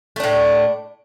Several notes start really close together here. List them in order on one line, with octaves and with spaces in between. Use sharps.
A3 D4 A2